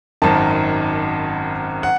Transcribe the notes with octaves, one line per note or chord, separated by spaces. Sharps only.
G#1 F#2 D#3 A5
F#5